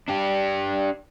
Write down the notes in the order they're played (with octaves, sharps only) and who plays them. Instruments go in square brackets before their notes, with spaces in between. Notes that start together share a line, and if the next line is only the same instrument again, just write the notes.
[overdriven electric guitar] D4 G4